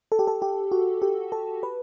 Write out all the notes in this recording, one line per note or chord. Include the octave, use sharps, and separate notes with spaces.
A4
G4
A4
G4
F#4
G4
A4
B4